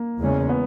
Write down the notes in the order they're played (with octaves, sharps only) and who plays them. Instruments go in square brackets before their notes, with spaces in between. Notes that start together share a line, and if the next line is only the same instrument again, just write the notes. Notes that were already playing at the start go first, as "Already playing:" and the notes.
Already playing: [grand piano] A#3
[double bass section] E2 C#3 G#3 C#4
[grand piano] B3